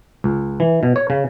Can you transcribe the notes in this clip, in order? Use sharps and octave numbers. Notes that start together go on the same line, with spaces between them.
C#2
E3
B2
C#5
C#3